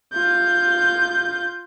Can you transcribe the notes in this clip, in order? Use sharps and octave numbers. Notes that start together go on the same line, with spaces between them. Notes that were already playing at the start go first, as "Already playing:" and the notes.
F4 G6